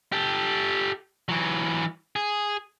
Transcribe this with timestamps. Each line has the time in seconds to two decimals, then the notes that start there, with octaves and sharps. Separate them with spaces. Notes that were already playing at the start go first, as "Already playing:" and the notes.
0.12 G4 A4
1.29 E3 F#3
2.16 G#4